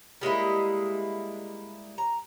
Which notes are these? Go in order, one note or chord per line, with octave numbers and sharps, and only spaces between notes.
G3 G#3 A#3 E4
A#5